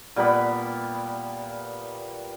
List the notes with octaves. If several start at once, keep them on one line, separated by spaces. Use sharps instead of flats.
A#2 G3 B3 B5